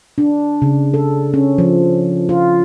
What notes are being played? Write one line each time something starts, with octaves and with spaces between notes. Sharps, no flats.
D4
C#3
A4
C#4
F3
F4